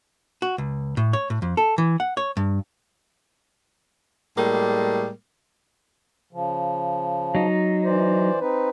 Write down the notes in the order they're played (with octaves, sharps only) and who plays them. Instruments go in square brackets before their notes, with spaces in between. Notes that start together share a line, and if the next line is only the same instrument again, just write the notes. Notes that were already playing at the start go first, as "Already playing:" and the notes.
[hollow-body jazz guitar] F#4
C#2
A2
C#5
A2
F2
A4
E3
F#5
C#5
G2
[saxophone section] A2 G3 G#3 A#3
[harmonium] C#3 F3
[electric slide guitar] F#3 D#4
[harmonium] E3 C5 D5
C4 D#4 B4